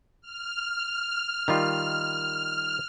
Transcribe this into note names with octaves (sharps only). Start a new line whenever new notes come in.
F6
D#3 G3 F4